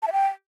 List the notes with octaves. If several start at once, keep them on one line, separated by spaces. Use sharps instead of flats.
A5
E5
G5